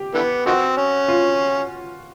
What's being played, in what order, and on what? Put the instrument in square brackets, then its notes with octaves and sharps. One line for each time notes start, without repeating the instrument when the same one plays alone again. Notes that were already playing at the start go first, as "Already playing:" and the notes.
Already playing: [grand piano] G4
[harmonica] D3 E3 B3
[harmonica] D#3 F3 C4 [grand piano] F#4
[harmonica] C#4
[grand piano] F4